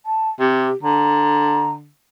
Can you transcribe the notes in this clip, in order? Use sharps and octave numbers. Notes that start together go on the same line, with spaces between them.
A5
C3 G4
D3 A#5